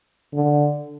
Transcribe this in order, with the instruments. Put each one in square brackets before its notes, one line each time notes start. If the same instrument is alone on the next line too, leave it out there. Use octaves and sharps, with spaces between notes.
[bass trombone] D3